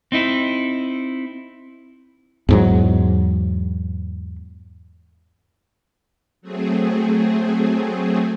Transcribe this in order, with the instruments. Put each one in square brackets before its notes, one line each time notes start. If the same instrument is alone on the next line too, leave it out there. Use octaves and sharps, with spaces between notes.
[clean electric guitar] C4 D#4 E4
[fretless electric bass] E2 G#2 F#3
[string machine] F#3 A3 C4 G#4